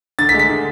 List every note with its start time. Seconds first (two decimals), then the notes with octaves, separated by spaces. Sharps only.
0.19 D3 A6
0.29 B6
0.34 G#3
0.39 B6
0.49 D3